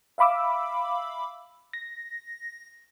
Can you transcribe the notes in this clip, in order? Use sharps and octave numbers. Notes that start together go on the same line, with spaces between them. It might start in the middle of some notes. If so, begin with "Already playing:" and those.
E5 F5 B5 D6 E6
A#6